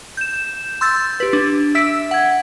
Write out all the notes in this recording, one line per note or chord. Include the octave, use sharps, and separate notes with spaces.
G6 E7
C6 E6 G6 A6
G4 B4
D4
E5 E6 B6 D7
F#5 G#6